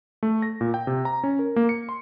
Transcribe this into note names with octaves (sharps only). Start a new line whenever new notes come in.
A3
A#6
A#2
G5
C3
A#5
C#4
A#4
A#3
C#7
C6